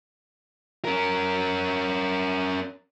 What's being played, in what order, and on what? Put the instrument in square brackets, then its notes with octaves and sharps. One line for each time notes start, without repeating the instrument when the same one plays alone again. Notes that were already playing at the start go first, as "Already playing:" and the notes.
[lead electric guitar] C#4 A#4